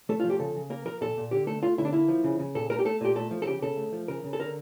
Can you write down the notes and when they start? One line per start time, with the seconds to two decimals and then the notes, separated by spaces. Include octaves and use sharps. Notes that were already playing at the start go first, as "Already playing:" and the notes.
0.09 A3 A4
0.20 F4
0.24 F3
0.30 G4
0.40 C#3 A4
0.55 C#3
0.70 A#3 A#4
0.85 F3 A#4
1.01 A#2 A4
1.17 A#2
1.31 D3 G4
1.47 A3 A4
1.62 A3 F4
1.78 D3 E4
1.85 D4
1.93 A#3 E4
2.08 F3
2.24 C#3
2.39 C#3
2.55 A#2 A4
2.70 A3 A#4
2.79 G4
2.85 A3 A4
3.01 A#2 G4
3.16 A3 A4
3.31 F3
3.42 A4
3.47 C#3 G4
3.62 C#3 A4
3.77 A3
3.92 F3
4.08 C#3 A#4
4.24 C#3
4.33 A4
4.39 D3 A#4